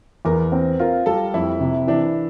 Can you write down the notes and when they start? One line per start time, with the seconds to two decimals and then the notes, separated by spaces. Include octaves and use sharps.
0.25 E2 A#4
0.52 C4
0.79 F4 A#4
1.06 G3 A4
1.34 F2 E4
1.61 C3
1.87 E3 D4